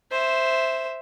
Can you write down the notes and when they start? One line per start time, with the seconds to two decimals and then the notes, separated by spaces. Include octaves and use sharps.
0.11 C5 E5